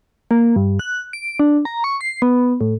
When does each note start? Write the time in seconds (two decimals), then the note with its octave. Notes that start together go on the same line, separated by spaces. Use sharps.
0.31 A#3
0.56 G2
0.79 F#6
1.13 D7
1.40 D4
1.65 A#5
1.84 C#6
2.01 C7
2.22 B3
2.61 A2